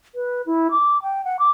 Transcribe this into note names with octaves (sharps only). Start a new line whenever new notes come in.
B4
E4
D6
G5
F#5
D6